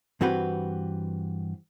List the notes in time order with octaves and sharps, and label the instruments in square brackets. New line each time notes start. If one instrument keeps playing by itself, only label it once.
[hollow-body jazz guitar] G2 E3 C4 F#4 G4 B4